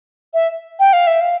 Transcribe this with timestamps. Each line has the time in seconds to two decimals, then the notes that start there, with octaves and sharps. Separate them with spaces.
0.34 E5
0.79 G5
0.93 F5
1.07 E5
1.21 F5